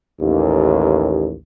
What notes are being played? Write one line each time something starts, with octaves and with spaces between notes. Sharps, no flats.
A1 D#2